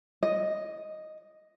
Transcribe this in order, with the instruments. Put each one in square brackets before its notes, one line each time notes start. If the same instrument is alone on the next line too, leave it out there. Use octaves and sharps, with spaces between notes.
[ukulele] D#5